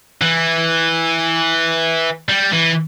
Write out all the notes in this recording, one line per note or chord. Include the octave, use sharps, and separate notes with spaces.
E3
G3
E3